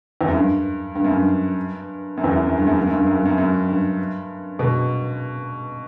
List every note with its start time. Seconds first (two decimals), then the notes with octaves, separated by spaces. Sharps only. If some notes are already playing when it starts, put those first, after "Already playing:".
0.21 E2
0.28 F#2
0.36 G2
0.95 G2
1.04 F#2
1.12 G2
2.17 F#2
2.24 E2
2.31 F#2
2.47 F#2
2.58 G2
2.67 F#2
2.77 G2
2.87 F#2
2.96 G2
3.06 F#2
3.15 G2
3.25 F#2
3.38 F#2
3.68 G2
4.59 B2